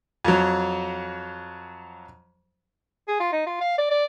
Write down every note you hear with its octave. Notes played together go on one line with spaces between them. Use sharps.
F2 F#3
G#4
F4
D#4
F4
F5
D5
D5